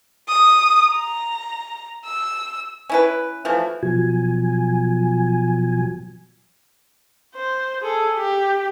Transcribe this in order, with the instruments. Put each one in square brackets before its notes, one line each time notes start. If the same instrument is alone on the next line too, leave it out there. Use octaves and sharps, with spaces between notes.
[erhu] D#6
A#5
E6
[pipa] C#4 E4 B4
E3 F3 A3 F#4
[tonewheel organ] B2 F3 F#3 G#5
[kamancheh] C5
G#4 A4
G4